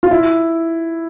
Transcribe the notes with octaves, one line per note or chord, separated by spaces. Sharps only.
F4
E4